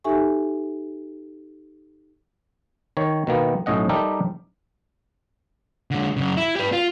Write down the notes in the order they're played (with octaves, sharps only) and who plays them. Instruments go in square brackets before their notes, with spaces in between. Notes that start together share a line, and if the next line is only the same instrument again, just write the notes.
[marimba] D#4 G4 A4 E5 G#5 C#6
[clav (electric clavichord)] D#3 C#5
B2 D#3 A#3 B3
B1 A2 C#4 D#5 F#5
G3 D#4 G4 A4 A#4 E5
[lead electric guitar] D3 G#3
F#2 C#3
E4
G4 B4
F4